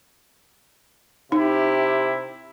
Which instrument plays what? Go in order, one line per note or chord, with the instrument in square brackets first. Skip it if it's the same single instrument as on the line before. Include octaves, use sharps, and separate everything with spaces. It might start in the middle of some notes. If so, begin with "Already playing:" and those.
[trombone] C3 [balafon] D#4 [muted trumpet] E4 [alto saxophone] G4